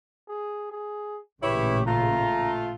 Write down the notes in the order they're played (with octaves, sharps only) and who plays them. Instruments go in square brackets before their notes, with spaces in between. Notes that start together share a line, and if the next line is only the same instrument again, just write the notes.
[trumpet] G#4
G#4
[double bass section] A1 A#2 C#3 [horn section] E4 B4 C#5 [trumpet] G4
[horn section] A3 F4 [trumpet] A#5